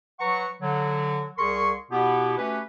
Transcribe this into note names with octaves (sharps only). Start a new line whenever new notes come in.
F#3 B4 F#5 A#5 C#6
D3 F#3
C2 G#4 A#4 C6 C#6
B2 B3 E4 G4
A3 C#4 F#4 G4 B4